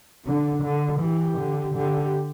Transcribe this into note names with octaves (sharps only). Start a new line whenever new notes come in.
D3 D4
D3
E3 G4
D3
D3 G4